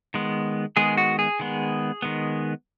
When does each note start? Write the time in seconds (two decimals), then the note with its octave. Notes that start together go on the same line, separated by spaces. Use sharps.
0.14 D#3 G#3 B3
0.77 D#3 G#3 B3 G#4
0.97 F#4
1.19 G#4
1.39 D#3 G#3 B3
2.02 D#3 G#3 B3